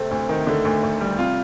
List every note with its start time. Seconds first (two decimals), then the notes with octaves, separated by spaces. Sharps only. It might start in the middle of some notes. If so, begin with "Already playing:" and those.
Already playing: C3 A3 C4
0.11 D2
0.29 D#3
0.47 D3 A3
0.65 D2
0.83 D2
1.01 G3
1.19 C3 F4